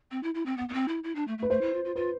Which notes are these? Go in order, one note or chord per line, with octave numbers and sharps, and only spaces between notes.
C4
E4
E4
C4
B3
B3
C4
E4
E4
D4
A3
A3
B4
A3 C5
E4
F4
F4
F4 B4